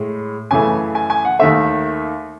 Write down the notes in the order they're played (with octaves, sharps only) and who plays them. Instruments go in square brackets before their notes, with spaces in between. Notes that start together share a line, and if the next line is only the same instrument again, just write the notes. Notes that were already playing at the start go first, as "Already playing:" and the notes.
Already playing: [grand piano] A2 G#3
F#2 C#3 E3 A3 G#5
G#5
G#5
F#5
D#2 D#3 A3 E5